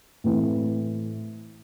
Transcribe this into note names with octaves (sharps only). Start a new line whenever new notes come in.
A2 E3 A3 C4 E4